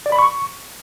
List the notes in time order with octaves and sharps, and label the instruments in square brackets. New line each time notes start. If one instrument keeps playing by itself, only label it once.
[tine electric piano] D5
B5
C#6